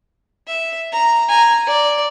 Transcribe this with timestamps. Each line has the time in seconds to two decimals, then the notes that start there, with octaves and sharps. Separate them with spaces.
0.47 E5
0.92 A#5
1.28 G#5 A#5
1.67 D5